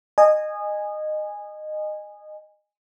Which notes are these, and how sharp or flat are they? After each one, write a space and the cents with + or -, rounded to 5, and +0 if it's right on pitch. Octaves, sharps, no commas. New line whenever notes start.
D#5 -20 G#5 -10